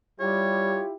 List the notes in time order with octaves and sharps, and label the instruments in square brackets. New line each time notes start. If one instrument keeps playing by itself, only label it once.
[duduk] G3 [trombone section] E4 F4 G4 [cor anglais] C#5